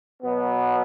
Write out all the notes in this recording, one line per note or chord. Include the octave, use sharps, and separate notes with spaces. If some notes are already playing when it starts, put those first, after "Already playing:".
B2 F#3 B3